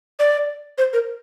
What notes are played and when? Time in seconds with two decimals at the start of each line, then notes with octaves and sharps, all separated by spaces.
0.19 D5
0.78 C5
0.93 A#4